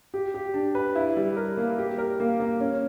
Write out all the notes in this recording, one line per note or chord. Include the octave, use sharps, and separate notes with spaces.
G4
G4
D4
B4
E4
G3
A#4
A#3
G4
A#4
A#3
A#3
C#4